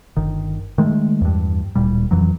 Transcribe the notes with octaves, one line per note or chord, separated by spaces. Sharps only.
G1 D#3
D#3 G#3 A3
E2 G2
D1 A#2 G3
F2 E3 F#3